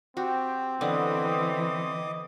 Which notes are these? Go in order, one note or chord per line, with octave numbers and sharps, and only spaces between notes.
C4 F#4 G4
D3 E3 B3 D#5 D6 D#6